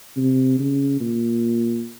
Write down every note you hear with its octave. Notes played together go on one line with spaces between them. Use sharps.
C3
C#3
A#2